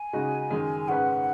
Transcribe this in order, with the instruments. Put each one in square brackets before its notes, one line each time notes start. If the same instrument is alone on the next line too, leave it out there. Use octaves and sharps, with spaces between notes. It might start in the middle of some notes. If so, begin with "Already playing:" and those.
Already playing: [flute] G#5
[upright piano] C#3 G#3 D#4 F#4
F#2 D#3 G#3
[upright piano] G#2 G#3 C#4 B4 [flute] F#5